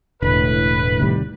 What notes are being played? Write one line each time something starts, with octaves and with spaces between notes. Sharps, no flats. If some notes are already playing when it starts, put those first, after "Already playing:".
E1 A2 D3 B4
C3 D#3 G3